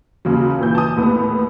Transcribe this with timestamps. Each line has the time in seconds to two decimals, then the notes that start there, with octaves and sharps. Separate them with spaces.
0.25 D#2 C#3 F#3
0.59 A#2 E3 G6
0.75 A5 D#6
0.96 D#2 A2 B3